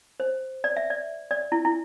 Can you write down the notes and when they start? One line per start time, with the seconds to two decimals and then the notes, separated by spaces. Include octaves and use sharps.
0.20 C5
0.64 D5
0.77 E5
0.90 D5
1.31 D5
1.52 E4
1.65 E4